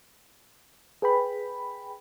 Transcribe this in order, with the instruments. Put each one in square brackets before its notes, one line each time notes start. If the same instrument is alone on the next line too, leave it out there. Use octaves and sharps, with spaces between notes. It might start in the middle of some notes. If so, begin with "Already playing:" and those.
[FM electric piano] G#4 B4 G5 B5